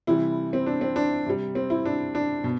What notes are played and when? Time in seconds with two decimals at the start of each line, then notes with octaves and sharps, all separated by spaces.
0.07 C3 E3 G3 E4
0.53 C4
0.66 D4
0.81 C4
0.96 D4
1.26 C3 G3
1.55 C4
1.70 E4
1.85 D4
2.15 D4
2.44 B2